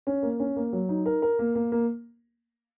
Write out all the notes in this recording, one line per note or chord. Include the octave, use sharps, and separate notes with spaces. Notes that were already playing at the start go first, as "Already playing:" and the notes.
C#4
A#3
C#4
A#3
F#3
D#4
A#4
A#4
A#3
A#3
A#3